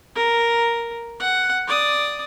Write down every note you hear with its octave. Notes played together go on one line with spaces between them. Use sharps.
A#4
F#5
D5 D#6